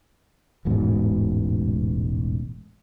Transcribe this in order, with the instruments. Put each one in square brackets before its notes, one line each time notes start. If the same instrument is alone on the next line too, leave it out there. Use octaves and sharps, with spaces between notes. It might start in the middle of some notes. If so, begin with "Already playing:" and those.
[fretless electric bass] E1 A1 G#2 B2